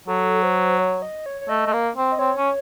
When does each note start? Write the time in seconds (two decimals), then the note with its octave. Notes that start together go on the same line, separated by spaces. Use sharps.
0.07 F#3 A4
0.43 C5
0.79 C#5
1.02 D#5
1.26 C#5
1.41 C#5
1.49 A3 D#5
1.66 A3
1.73 A#3
1.97 C4
2.12 D#5
2.19 C4 C#5
2.37 C#4